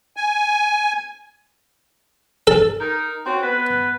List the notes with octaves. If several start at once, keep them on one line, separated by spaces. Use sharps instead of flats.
G#5
A4
D#4 A#4
C4 C#4 F#4
B3 B4